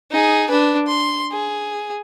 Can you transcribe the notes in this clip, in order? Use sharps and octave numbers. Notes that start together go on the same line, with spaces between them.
D#4 G#4
D4 B4
C6
G#4